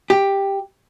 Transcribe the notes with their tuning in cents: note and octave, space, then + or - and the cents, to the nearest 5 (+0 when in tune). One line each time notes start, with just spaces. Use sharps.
G4 +5